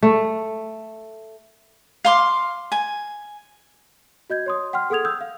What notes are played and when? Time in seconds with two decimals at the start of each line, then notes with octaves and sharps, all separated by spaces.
0.03 A3
2.05 F5 C6 D6
2.72 G#5
4.30 F#4 D#5 G6 G#6
4.46 C#5 C6 D#6
4.73 F#5 G5 C6 F6
4.90 G#4 A4 F#5 D#6 G#6 F7
5.05 D#6 E6 G6
5.21 F5